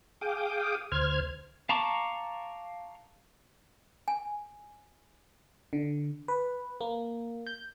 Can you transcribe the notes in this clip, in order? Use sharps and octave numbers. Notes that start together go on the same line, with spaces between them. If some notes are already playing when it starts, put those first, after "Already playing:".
G#4 F5 G5 D6 D#6
D2 C5 F6 G#6
F5 A5 A#5 C#6 D6
G#5
D3
B4
A#3
G6